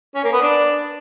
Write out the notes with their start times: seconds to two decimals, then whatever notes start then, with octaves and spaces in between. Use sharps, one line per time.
0.15 C#4
0.24 A#3
0.33 B3
0.42 D4